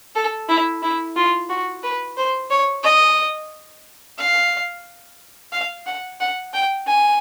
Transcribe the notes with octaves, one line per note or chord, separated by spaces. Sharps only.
A4
E4
E4
F4
F#4
B4
C5
C#5
D#5
F5
F5
F#5
F#5
G5
G#5